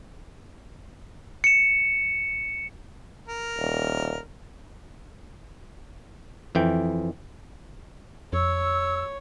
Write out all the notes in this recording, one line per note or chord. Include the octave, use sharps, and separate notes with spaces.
C#7 E7
A#4
D#1
F2 E3 G5
F2 C#5 E6